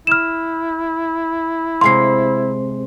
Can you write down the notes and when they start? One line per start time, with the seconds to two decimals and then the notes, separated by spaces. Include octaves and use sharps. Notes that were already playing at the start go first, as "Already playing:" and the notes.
0.07 E4 F6 E7
1.81 C3 G#3 F5 C6 C7